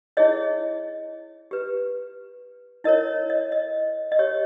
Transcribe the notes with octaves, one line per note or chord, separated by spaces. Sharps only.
E4 G#4 C#5 D#5
G4 B4
E4 A#4 C#5 D#5
C#5
D#5
D#5
D#5
G4 C#5